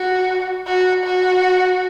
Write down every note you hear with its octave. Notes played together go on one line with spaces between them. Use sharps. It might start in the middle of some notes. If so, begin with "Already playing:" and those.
Already playing: F#4
F#4
F#4